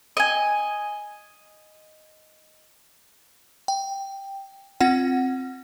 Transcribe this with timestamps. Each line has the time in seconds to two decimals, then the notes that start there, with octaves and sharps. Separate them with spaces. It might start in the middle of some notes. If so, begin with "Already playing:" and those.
0.17 D#5 G#5
3.68 G5
4.80 C4 F4 F#5